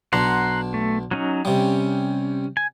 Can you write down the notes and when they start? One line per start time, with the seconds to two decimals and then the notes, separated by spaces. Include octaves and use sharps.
0.13 B1 D4 F#5 A#5 C6
0.74 A3
1.11 F#3 C#4 D#4
1.45 C3 G3 C#4
2.57 G#5